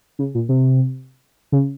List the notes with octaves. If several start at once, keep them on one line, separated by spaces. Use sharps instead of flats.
C#3
A#2
C3
C#3